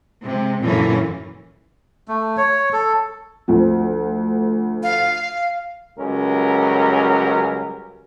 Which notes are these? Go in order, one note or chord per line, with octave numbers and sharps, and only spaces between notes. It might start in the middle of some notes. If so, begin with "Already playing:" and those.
C3 G#3
F#2 A#2 D3 E3 A#3 C#4
A3
C#5
A4
D2 F3
F5
C#2 F#3 G3 C#4 A#4